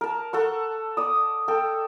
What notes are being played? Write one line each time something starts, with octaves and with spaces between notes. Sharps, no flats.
A#4 A5
A4 F#5 C#6
D5 D#6
A4 G5